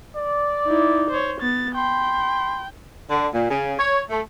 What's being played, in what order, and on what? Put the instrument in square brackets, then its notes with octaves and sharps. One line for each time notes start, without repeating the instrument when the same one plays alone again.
[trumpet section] D5
[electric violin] D#4 E4
C5 C#5
B3 A6
[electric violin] G5 [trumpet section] B5 C6
[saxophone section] D3
A#2
C#3
C#5
A3